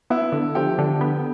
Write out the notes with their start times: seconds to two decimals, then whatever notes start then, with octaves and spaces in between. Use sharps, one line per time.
0.10 B3 E4
0.32 D3
0.55 F3 G4
0.79 D3
1.01 B3